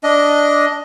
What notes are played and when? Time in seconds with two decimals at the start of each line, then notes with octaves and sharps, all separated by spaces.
0.03 D4 D#5